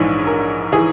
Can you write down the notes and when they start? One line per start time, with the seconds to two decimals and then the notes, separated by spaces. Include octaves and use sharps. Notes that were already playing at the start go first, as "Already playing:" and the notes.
Already playing: A#1 G#2 E3 C#5
0.27 A#4
0.72 E3 G#4